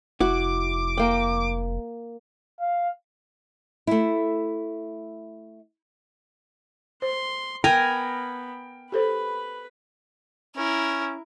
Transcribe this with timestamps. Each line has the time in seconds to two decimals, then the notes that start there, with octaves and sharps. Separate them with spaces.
0.20 F1 E4 F#4 D6
0.98 A#3 G5
2.60 F5
3.87 A3 E4
7.02 C5 C6
7.64 B3 A#4 G5 G#5 B5
8.92 G4 A4 B4 C5 B5
10.56 C#4 E4 A#4